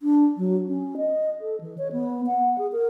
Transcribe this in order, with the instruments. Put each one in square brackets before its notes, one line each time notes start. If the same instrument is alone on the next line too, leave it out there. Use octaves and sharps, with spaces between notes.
[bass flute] D4
F#3
C#4
D#5
A4
E3
C#5
B3
F#5
G#4
A#4